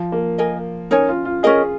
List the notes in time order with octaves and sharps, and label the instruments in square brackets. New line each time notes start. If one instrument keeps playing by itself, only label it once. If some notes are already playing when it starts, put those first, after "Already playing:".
Already playing: [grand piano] F3
A#3
[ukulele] A#4 D#5 G#5
[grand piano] C#4 [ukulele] D#4 A#4 C#5 G#5
[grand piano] F4
F4
[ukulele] C#4 A#4 D#5 [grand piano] G#4